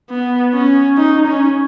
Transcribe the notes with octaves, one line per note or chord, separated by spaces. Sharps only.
B3
C#4
D#4
C#4